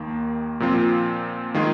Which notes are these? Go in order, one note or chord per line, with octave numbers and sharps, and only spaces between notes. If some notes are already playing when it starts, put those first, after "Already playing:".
Already playing: D#2 D#3 A#3
A#2 F3 C4 F4
D#3 G#3 F4 G#4